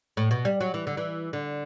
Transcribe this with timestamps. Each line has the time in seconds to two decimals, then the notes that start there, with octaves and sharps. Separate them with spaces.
0.17 A2
0.31 B2
0.45 G3
0.61 F#3
0.74 E3
0.87 D3
0.97 E3
1.33 D3